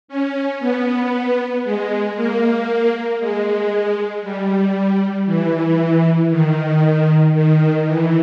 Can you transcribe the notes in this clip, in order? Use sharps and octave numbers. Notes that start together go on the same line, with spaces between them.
C#4
B3
G#3
A#3
G#3
G3
E3
D#3
D#3
E3